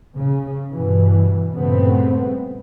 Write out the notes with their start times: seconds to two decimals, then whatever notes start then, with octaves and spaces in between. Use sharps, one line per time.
0.16 C#3
0.72 G2 B2 E3
1.54 G2 A#2 C#3 A3 B3 C4